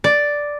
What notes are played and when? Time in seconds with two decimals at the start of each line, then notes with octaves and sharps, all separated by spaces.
0.04 D5